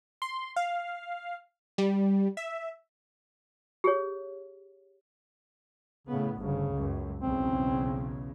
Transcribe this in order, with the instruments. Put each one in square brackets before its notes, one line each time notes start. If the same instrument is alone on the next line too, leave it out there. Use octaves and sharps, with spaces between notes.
[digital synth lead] C6
F5
G3
E5
[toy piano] G4 G#4 C#5
[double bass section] A2 B3 [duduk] C#3
[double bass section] G1 D2 [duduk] C#3
[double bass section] C#2 F#2
[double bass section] B1 E2 C#3 [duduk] C4